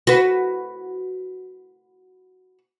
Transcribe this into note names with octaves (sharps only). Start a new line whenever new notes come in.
F#4 B4